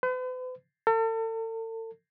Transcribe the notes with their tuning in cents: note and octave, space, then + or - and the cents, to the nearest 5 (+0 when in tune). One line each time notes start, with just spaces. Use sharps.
B4 +45
A4 +40